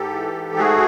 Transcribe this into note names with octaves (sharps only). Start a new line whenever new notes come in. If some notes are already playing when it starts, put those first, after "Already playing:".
Already playing: G#2 G4 A4
E3
G#2
A3 F#4 G#4